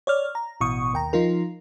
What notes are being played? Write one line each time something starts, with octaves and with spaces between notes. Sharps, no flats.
C#5 D5 F6
A#5
A1 B2 C#6 D#6
D#2 G5 A#5
F3 D#4 F4 A#4